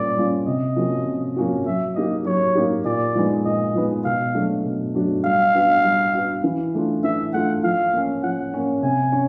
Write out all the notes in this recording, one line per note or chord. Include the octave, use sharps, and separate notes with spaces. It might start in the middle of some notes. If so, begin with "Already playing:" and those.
Already playing: A#2 G3 A#3 C#4 D5
G3 A#3 C#4 F4
C3 D#5
F3 A#3 C#4 F#4
C3
F3 A#3 C#4 F#4
F#3 E5
A#3 D#4 G4 D#5
F#3 C#5
A#3 D#4 G4
A#2 D5
F3 G#3 B3 D#4
A#2 D#5
F3 G#3 B3 D#4
B2 F5
F#3 A3 D4 F#4
B2
F#3 A3 D4 F#4
G3 F5
B3 D4 F#4
G3
B3 D4 F#4
E3
A3 D4 F4
E3 E5
A3 D4 F4 F#5
F3 F5
A#3 C#4
F3 F#5
A#3 C#4
C3 G#5
C#4